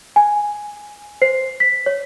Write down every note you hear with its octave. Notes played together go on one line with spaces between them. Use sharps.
G#5
C5 C7
B6
C#5